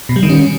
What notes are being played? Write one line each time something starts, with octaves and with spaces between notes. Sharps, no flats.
B2
G3
D#3
C#4